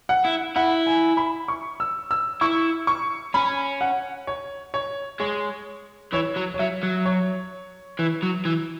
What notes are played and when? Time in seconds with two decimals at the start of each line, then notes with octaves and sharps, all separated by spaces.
0.09 F#5
0.25 E4
0.56 E4 F#5
0.87 G#5
1.17 B5
1.48 C#6
1.80 E6
2.11 E6
2.41 E4 C#6
2.87 C#6
3.34 C#4 B5
3.81 F#5
4.27 C#5
4.74 C#5
5.20 G#3 C#5
6.13 E3 C#5
6.37 F#3
6.54 C#5
6.59 F#3 E5
6.83 F#3
7.06 C#5
7.99 E3
8.23 F#3
8.45 E3